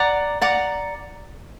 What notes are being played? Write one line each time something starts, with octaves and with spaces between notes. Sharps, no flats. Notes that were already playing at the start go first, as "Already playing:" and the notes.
Already playing: D5 F#5 A#5 D6
D5 F#5 A#5 D6